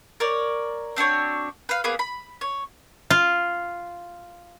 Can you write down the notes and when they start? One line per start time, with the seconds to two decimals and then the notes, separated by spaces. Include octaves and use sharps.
0.20 A#4 C#5 D5
0.96 C4 D4 F#4 C#5
1.69 B4 F5
1.84 A#3 B3 G#4 B5
1.99 B5
2.41 C#5
3.10 F4